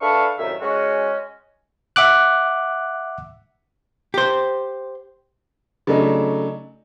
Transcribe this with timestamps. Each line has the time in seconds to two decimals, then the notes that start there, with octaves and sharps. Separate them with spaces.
0.01 D4 A4 B4 E5 F5 C#6
0.38 C2 F#2 A2 D#3 E5
0.61 G#3 C#4 F#4
1.96 E5 F#5 D6 F#6
4.14 G4 C5
5.87 C#3 F#3 A3 D4 D#4